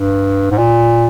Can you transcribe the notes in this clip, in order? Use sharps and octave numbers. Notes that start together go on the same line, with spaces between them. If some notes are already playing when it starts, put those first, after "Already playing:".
Already playing: G2
G#2
A#2